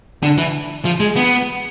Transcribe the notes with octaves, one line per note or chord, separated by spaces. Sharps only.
D3
E3
F3
G#3
B3